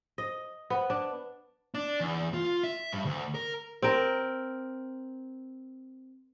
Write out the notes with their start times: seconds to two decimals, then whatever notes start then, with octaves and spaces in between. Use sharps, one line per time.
0.18 D#5
0.70 B3
0.90 D4
1.74 D4
2.01 E2
2.34 F4
2.63 E5
2.93 G2
3.05 D2
3.34 A#4
3.82 C4 A#4